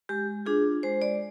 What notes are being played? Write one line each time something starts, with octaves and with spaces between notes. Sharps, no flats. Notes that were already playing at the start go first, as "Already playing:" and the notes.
G#3 G4
D4 F4 G#4
G#3 C5
D5